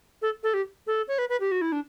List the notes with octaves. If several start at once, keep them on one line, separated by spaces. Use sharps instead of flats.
A4
A4
G4
A4
C#5
B4
B4
G4
F#4
E4
D4